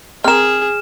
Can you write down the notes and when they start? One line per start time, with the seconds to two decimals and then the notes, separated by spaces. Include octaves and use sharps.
0.24 C4 G#4 A#4 F6 E7